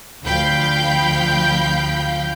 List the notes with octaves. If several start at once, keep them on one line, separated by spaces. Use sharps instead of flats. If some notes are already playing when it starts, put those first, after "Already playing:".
D2 F3 F5 G5 B5 G6